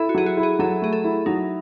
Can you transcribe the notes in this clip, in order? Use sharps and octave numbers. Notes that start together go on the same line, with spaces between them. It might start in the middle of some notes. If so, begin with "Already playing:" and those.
Already playing: E4 A4
F#4
F#3 G#4
F#4
E4
G#4
F#3 A4
A3 G#4
A4
E4
F#3 D#4